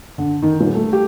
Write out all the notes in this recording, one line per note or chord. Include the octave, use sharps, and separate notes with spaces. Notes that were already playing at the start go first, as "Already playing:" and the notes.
D3
D#3
D#1
A3
G4